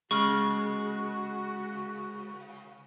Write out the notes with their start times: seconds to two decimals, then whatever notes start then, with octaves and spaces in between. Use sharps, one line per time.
0.11 C#3 G#3 F#4 C#6 F6